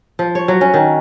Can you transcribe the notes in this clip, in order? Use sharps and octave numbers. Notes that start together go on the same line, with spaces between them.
F3
C#5
F#3
C#4
D#3